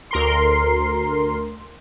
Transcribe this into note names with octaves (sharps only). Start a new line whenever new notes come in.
D2 A#4 C6